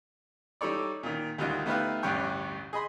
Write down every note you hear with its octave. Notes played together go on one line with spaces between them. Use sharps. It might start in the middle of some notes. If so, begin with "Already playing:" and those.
G3 D#4 A4 C#5 D5
A#2 D#3
D2 D3 D#3 G3 F4 D#5
A3 B3 D#4 G4 B4 F5
A1 D2 G2 G4 C#5 G5
G#4 D#5 B5 C6